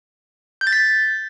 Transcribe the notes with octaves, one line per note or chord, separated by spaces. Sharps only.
G6
A6
B6